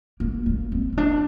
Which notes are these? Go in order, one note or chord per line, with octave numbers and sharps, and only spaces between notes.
A#3
A#3
C4
C4
D4